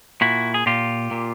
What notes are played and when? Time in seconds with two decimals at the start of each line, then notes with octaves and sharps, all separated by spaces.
0.21 A#2 E4 F#4
0.54 G#4
0.66 A#2 F4 G4
1.11 A#2